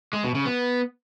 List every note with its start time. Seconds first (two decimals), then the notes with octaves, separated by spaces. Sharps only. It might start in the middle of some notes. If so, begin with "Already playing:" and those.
0.13 G#3
0.24 B2
0.35 C#3
0.45 B3